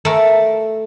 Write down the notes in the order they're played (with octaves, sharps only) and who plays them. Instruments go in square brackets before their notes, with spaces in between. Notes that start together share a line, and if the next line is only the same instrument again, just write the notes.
[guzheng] A3 A#4